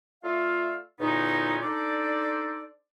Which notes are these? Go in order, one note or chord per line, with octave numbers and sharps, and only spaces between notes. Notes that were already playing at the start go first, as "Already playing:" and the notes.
A3 F4 D5 E5 F5
E2 A#2 D3 B3 C#4 D#4
D4 D#4 A4 C5 D5